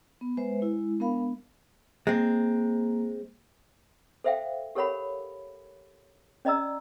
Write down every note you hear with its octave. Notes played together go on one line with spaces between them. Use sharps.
B3
G#3 B4 C5 E5
G#3 E4
G#3 B3 D4 A#4 F5 B5
G#3 A#3 C4
A4 C5 E5 F5 G5
G4 A4 A#4 C#5 F#5 B5
C#4 D5 D#5 A#5 E6